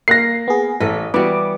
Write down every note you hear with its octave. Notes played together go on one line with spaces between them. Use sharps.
A#3 F5 F#6 A#6 C7
B3 G#4
A1 A4 D#5 B6
E3 G3 B3 F#4 D6